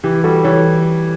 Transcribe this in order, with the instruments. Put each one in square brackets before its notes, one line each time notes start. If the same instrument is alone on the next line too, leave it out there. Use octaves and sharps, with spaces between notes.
[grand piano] E3 [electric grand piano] G4
[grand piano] G3 [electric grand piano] F#4 A4
[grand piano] E3 [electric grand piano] A4 C#5